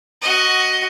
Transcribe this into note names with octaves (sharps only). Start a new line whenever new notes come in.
F#4 D#5